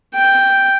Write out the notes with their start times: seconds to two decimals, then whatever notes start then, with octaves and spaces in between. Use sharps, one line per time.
0.15 G5